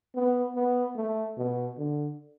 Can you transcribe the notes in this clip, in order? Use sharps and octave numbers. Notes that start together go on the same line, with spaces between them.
B3
B3
A3
B2
D3